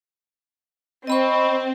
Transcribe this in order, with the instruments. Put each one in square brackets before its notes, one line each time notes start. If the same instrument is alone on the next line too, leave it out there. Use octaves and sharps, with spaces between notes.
[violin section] C4 [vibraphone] D#5 B5 C#6